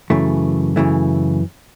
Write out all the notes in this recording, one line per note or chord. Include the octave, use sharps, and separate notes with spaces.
F#2 C#3 E3 A3
F#2 C#3 E3 A3